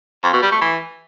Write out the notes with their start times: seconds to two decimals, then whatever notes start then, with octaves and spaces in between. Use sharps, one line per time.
0.24 F2
0.33 B2
0.42 G3
0.52 A3
0.61 E3